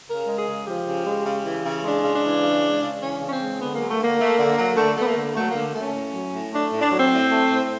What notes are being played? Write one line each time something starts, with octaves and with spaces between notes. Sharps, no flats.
C#3 A#4
G#3
G#4
C#3
F3 G4
C#3
G#3
C#3
E3
C#3
G#3 D4
C#3
D4
E3
C#3
G#3
C#3
E3 C#4
C#3
C#4
C4
G#3
D3 B3
F#3 A#3
A3
D3
A#3
A3
D3
F#3
D3 A3
A3 B3
A#3
D3
F#3 A3
A#3
D3
A3 C#4
A2
F#3
A2
A3 D4
A2
D4
F#3
C4
A2
A3
A2